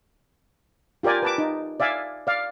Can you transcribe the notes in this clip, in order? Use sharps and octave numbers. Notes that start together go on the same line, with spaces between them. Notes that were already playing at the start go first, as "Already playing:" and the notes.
F4 G4 A#4 D5 G#5
B4 A5 D6
D#4
D5 E5 F5 G#5
D5 F5